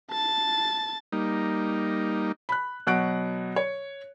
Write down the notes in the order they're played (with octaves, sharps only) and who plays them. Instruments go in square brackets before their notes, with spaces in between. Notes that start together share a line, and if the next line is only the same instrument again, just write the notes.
[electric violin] A5 A6
[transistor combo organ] G3 A#3 D#4
[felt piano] B5 F#6
B2 F#3 F#5 C#6 F#6 D7
C#5